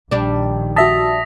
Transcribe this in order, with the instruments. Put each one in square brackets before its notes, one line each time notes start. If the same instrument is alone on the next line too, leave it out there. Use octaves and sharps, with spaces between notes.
[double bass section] A#1 D#3 [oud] G3 D4
[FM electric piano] F#4 E5 A5 [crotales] D#6 A#6 B6